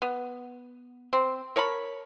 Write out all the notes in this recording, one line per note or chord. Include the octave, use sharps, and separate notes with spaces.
B3
C4
A#4 C#5 A5 B5